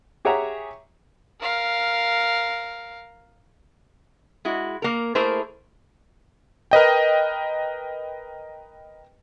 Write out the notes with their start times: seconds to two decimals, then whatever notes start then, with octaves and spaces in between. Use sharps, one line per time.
0.25 G4 G#4 C#5 E5 F#5 A#5
1.42 A#4 F5
4.45 G#3 E4 F#4
4.82 A#3 A#4
5.15 A3 A#3 E4 G#4 A#4 C5
6.71 A#4 B4 D#5 G5